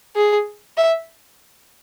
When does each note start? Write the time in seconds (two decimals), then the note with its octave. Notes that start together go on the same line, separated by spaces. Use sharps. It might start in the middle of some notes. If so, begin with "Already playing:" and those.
0.16 G#4
0.77 E5